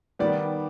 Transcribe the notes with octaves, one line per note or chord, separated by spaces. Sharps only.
D#3 G3 B3 D5